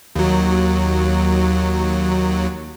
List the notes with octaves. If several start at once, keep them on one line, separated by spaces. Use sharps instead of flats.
D#2 F#3